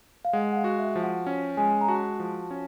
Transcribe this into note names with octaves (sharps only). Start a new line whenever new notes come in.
F5
G#3 F#5
F#5
F5
F#4
E5
F3
F#5
C#4 G5
G#3 G#5
A#5
F#4 A5
F3
C#4